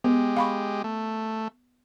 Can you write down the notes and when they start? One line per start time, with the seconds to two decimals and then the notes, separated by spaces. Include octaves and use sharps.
0.04 G#3 B3 G4
0.37 F5 B5 C#6
0.84 A3